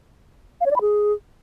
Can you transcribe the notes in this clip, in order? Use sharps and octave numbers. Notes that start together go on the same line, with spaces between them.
F5
C#5
D5
B5
G#4